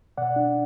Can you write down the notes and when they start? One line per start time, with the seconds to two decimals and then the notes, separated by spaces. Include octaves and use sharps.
0.17 B2 D5 F#5
0.36 D4